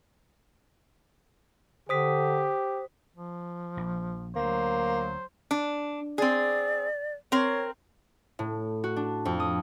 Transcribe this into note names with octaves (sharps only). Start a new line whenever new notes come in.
D3 G4 C5 D#6 B6
F3
A#1
D2 F#3 A#3 C5
D4
C4 G#4 D5
C4 A#4 C#5
A2
F#4
D4
F2
D#6